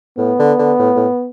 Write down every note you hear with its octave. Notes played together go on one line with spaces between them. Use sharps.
A2 B3
D3
D3
A2
A2